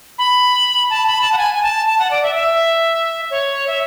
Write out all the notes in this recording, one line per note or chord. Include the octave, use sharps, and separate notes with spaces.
B5
A5
B5
A5
F#5
G#5
G#5
A5
A5
F#5
D5
E5
E5
C#5
E5